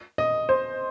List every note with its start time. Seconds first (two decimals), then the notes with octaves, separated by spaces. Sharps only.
0.18 D#5
0.49 C5